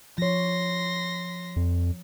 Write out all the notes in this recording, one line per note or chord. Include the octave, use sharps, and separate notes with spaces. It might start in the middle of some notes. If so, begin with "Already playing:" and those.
F3 C#5 C6 A#6
F2